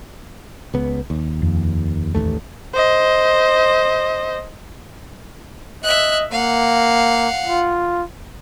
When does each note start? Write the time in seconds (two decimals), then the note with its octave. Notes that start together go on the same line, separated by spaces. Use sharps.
0.74 C#2 B3
1.10 D#2
1.42 F2
2.15 A1 D#2 A3
2.74 C5 D#5
5.84 D#5 E5 F#6
6.32 A#3 F5 F#5
7.47 F4